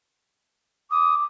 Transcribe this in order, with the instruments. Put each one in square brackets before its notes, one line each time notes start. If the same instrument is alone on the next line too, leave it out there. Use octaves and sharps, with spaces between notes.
[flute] D6 [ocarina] D#6